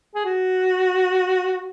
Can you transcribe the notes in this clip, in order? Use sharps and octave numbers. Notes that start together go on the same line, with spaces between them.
G#4
F#4